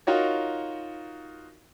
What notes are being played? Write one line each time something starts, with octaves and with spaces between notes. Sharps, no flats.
D#4 F4 F#4 A#4 C#5